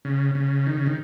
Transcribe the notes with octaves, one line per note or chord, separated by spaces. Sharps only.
C#3
C#3
D#3
C#3
D#3